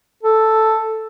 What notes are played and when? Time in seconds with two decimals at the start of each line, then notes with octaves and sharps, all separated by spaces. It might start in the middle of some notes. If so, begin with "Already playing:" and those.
0.23 A4